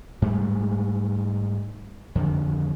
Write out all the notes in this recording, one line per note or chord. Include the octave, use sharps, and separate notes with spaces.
G#2 G3 A3
F2 D3 D#3